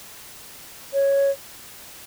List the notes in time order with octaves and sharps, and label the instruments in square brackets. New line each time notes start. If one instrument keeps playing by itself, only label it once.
[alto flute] C#5